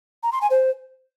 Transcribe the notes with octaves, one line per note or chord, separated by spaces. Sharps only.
A#5
C6
G#5
C5